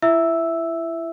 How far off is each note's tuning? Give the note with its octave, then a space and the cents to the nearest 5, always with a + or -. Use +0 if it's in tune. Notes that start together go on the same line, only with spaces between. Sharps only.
E4 +25 E5 +0 E6 +0